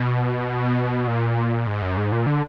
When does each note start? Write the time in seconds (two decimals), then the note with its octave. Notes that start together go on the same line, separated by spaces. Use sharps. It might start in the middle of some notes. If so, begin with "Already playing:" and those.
Already playing: B2
1.07 A#2
1.67 G#2
1.82 F#2
1.97 G#2
2.12 A#2
2.26 D3